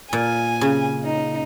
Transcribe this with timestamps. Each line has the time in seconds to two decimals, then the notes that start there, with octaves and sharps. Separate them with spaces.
0.13 A#2 G#5
0.61 C#3
1.05 D#4